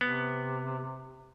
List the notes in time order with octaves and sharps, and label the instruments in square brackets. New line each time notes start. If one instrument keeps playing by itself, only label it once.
[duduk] C3 [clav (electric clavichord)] B3